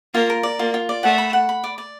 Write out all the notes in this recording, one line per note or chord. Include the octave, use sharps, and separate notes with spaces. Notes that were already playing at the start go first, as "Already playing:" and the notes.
A#3 F4
A#4
D5
A#3 F4
F4
D5
A3 F#5
B5
F#5
B5
D5
D5